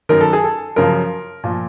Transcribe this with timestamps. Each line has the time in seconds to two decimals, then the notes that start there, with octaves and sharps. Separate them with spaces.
0.09 F#2 D#3 A#4
0.21 A4
0.33 G#4
0.44 A4
0.76 F#2 C#3 F3 A#4
1.44 A#2 F3